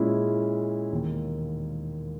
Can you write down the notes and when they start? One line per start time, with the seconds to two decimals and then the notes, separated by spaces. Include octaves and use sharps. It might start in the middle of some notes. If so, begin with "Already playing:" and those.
Already playing: A#2 G#3 C#4 E4
0.92 E1 D#2 D#3 A#3